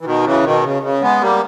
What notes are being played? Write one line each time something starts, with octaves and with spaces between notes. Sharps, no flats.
E3
B2 D#3
C#3 E3
B2 D#3
C#3
C#3
G#3 B3
G3 A#3